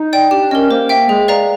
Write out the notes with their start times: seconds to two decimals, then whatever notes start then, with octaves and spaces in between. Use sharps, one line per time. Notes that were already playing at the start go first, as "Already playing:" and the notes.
Already playing: D#4
0.13 D5 G5
0.31 D4 G4
0.42 D4
0.51 C#4 A#4 D#5
0.71 A#3 C5
0.89 E5 G5
1.09 G#3 G#4
1.28 B4 D5 F5 A#5